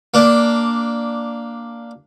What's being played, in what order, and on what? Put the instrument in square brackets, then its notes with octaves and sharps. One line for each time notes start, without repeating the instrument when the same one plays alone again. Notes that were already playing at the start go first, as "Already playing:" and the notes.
[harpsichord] A#3 D4